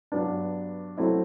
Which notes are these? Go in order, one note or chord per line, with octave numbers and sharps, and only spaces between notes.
G2 F#3 B3 D4
F#3 A3 C4 E4